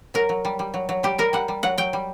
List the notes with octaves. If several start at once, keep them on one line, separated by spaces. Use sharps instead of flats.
F#3 A#4
F#3
G3
G3
F#3
F#3
G3 G4
G3 A#4
G3 F#5
G3
F#3 F#5
F#3 G5
G3